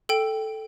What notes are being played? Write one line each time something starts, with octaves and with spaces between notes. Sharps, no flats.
A4 G5